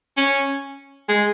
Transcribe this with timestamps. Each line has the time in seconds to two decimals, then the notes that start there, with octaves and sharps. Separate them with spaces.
0.17 C#4
1.08 G#3